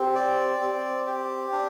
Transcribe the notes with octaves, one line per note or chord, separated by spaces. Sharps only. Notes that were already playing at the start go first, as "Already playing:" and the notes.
Already playing: C4 G4
D5
C4
G4
D4